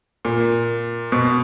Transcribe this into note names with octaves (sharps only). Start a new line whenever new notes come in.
A#2
B2